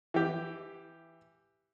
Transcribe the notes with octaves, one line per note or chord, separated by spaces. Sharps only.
E3 G4